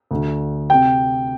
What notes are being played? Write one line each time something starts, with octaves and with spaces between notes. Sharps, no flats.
D2 D3
C3 G5